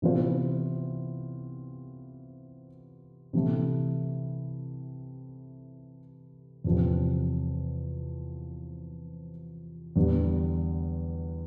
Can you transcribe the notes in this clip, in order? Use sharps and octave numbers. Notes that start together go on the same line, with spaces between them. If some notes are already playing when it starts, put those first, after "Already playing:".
C3 E3 B3 F4 C5
C3 E3 A3
E2 C3 F3 C4
E2 D3 G3 B3